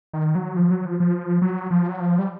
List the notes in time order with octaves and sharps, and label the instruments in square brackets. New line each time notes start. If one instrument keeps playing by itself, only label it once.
[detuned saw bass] D#3
F#3
F3
F#3
F3
F3
F#3
F3
F#3
F3
G3